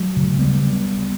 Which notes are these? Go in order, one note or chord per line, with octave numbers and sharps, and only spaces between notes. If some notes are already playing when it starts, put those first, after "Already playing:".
Already playing: F#3 A3
C#3
D2 G3 B3